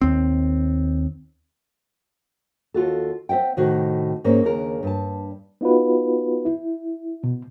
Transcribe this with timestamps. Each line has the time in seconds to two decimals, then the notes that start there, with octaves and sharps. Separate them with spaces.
0.02 D#2 C4
2.74 D#2 F4 F#4 A4
3.29 C4 C5 E5 F#5 G5
3.57 A2 C3 D#3 F#4
4.24 G#2 A#3 C4 C#4
4.44 D#2 C#3 D4 A#4
4.83 G2 A5
5.61 B3 D#4 F4 F#4 B4
6.45 E4
7.24 B2